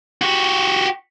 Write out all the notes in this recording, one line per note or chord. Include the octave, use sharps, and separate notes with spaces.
F#4 G4